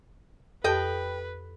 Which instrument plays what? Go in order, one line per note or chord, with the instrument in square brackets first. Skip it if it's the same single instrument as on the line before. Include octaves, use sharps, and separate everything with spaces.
[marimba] F2 G4 A5 [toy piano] A4 [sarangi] B4 [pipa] D#5 G5